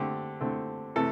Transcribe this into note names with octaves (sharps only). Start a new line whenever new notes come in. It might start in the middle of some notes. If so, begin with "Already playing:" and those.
Already playing: D3 A3 C4 G4
D3 A3 C4
C3 E3 A3 A4